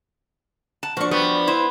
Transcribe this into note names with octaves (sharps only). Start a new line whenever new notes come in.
F#5 A5
F3 D4 F#4 C#6
G3 B3
E4 C5